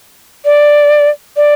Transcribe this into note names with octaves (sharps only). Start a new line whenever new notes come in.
D5
D5